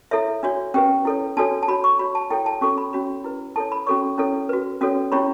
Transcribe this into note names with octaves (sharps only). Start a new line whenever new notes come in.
E4 A4 C#5 E5
D4 F#4 C#5
C#4 G4 B4 G5
E4 A4 C#5
D4 F#4 A4 C#5 A5
A5
F#4 C#5 B5
C#6
F#4 C#5 B5
A5
E4 A4 C#5 G5
A5
C#4 F#4 A4 C#5 C#6
B5
C#4 F#4 C#5 B5
E4 B4
E4 A4 C#5 A5
B5
C#4 F#4 A4 C#5 C#6
C#4 E4 A4 C#5
F#4 B4
C#4 F#4 A4 C#5
C#4 E4 G4 C#5 B5